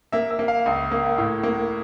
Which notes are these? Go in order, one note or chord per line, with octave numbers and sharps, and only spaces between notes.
A#3 E5
E5
A#3
F5
C#2
A#3
A2
A#3